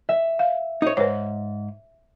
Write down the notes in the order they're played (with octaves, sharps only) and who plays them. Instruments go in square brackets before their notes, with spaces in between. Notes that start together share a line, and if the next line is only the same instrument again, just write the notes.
[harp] E5
[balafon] F5
[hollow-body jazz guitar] D#4 C#5
[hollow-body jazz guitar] G#2 [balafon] B4 C#5